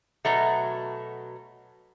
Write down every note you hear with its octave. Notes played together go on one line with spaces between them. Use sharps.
B2 F#3 A3